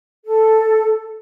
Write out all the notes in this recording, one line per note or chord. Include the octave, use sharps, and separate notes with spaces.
A4